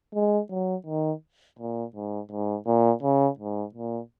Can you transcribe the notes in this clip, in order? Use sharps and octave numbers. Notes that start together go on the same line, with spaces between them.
G#3
F#3
D#3
A#2
G#2
G#2
A#2
C#3
G#2
A#2